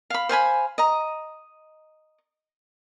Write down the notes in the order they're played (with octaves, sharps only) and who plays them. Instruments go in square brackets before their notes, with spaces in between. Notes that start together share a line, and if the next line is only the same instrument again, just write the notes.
[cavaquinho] F5 B5
C5 F5 G#5 B5
D#5 A#5